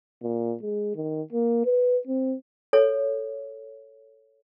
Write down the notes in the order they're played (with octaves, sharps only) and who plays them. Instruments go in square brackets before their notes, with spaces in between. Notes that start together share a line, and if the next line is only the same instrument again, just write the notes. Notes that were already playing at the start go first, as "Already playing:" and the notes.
[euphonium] A#2
G#3
D#3
A#3
B4
C4
[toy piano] A4 C#5